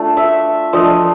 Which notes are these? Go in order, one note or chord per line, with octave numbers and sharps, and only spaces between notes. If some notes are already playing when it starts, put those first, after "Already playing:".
Already playing: A3 D4 F4
E5
F3 A3 D4 D#5